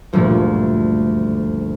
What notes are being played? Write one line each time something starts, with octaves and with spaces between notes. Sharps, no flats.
F#1 D2 G2 A#2 F3 A3